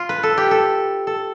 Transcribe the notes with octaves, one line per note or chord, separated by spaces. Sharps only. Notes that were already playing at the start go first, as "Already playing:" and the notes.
Already playing: F4
B4
A4
G4
A4
A4